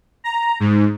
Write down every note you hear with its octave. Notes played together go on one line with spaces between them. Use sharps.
A#5
G#2